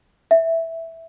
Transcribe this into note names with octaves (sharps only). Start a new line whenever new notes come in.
E5